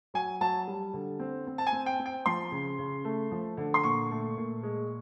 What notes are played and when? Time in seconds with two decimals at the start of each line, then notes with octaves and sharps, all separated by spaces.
0.14 F#3 G#5
0.41 F#3 A5
0.68 G3
0.94 D3
1.19 C4
1.47 C4
1.58 A5
1.67 G#5
1.72 C4
1.86 G5
1.99 C4
2.06 G5
2.26 F3 C6
2.52 C#3
2.79 C#3
3.05 A3
3.31 F3
3.57 D3
3.74 C6
3.83 A#2 C#6
4.11 A3
4.37 A#2
4.63 G#3